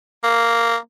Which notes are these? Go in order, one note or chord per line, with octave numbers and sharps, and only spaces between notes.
A#3